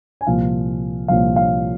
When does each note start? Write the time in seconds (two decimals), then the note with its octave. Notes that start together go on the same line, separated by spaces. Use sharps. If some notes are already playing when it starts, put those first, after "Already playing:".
0.21 G#5
0.27 C2 A#2 F3 F5
1.08 C2 A#2 F3 F5
1.36 F5